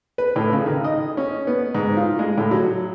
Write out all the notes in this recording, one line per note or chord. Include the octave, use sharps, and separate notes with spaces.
B4
A2
C#3
D#3
D#5
C#4
B3
G#2
F4
G#3
A2
F#3